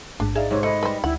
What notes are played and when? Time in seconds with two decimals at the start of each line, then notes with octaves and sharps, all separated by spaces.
0.20 A1 G#2 D4
0.36 D#4 G#4 D5 E5 F5
0.51 G#2 C3 C#5
0.63 A3 G#4 B4 D#5 C#7
0.83 G3 B4 C5
1.04 D2 E4 F#5